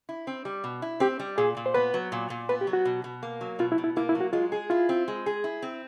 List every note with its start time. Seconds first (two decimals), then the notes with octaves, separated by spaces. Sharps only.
0.09 E4
0.27 C4
0.45 G3
0.64 B2
0.82 E4
1.00 C4 G4
1.19 G3
1.38 A#2 G#4
1.57 A#2
1.66 C5
1.74 B3 B4
1.94 F#3
2.12 A#2
2.30 A#2
2.49 B3 B4
2.61 G4
2.67 F#3
2.73 F#4
2.85 B2
3.04 B2
3.23 A#3
3.41 F#3
3.59 B2 F4
3.72 E4
3.78 B2
3.84 E4
3.96 A#3 E4
4.09 E4
4.15 F#3
4.21 F#4
4.33 G#3 F4
4.52 G#4
4.70 E4 F4
4.89 C4
5.08 G#3
5.26 G#4
5.44 E4
5.62 C4